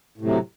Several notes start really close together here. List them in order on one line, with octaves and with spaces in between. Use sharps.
A2 C3 F#3